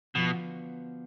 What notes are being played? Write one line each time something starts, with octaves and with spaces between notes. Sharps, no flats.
B2 D3 F3 B3 F#4